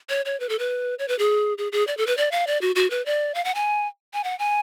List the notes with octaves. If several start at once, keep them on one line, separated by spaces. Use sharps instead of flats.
C#5
C#5
B4
A4
B4
C#5
B4
G#4
G#4
G#4
D5
A4
B4
D5
F5
D5
F#4
F#4
B4
D5
F5
F#5
G#5
G#5
F#5
G#5